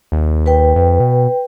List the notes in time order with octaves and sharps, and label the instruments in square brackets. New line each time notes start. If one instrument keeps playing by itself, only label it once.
[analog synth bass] D#2
[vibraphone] B4 G5
[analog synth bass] F2
B2